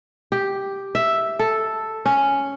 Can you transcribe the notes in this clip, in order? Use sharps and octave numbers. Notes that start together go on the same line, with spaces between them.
G4
E5
A4
C#4